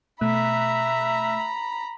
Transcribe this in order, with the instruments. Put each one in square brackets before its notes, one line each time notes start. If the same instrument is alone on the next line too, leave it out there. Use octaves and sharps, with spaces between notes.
[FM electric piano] B2 A3 F#6 [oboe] E5 [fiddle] A#5 B5